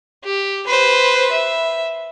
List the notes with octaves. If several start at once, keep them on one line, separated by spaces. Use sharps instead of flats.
G4
B4 C5
E5